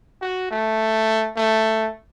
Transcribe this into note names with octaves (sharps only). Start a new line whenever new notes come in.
F#4
A3
A3